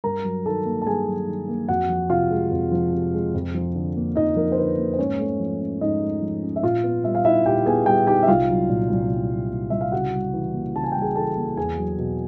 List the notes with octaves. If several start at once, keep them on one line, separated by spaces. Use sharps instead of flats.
G2 A#4 A#5
F#3
D#3 A4 A5
A#3
A5
G2 G#4 G#5
F#3
D#3
A#3
F2 F#4 F#5
F3
C3 F4 F5
G#3
F2
F3
C3
G#3
F2
F3
D3
A#3
F2 D#4 D#5
F3 A#4
C5
D3 B4
A#3
C5
G#2 C#4 C#5
A3
F3
C#4
G#2 D#4 D#5
A3
F3
C#4
E5
A#2 F4 F5
B3
G3 E5
F5
D#4 E4 E5
A#2 G4 G5
B3 G#4 G#5
G3 G4 G5
D#4 G4 G5
E5
C2 F4 F5
F#3
A#2
C2
C2
F#3
A#2
C2 E5
F5
C#3 F#4 F#5
G3
E3
A#3
C#3 A5
G#5
G3 G5
G#4 G#5
E3 A4 A5
A#3
E2 G#4 G#5
F#3
B2